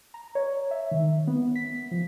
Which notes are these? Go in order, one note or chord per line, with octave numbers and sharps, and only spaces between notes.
A#5
C#5
E5
D#3
B3
B6
F3